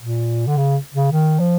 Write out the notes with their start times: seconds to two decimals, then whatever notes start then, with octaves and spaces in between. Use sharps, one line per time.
0.02 A#2
0.47 D3
0.57 C#3
0.94 C#3
1.12 D#3
1.40 F3